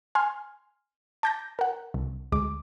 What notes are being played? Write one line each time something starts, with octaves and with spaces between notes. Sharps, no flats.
G#5 C6 F6
A5 D6 G6 A6 A#6
A#4 F#5
C2
D2 G#3 D6